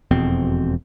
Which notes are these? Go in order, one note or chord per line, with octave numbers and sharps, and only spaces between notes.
E1 F2 B2 C4